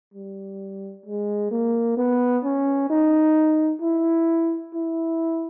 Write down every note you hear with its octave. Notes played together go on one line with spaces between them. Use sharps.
G3
G#3
A#3
B3
C#4
D#4
E4
E4